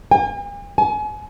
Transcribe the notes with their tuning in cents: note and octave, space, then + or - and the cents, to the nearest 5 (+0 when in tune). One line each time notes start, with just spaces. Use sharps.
G#5 -45
G#5 +35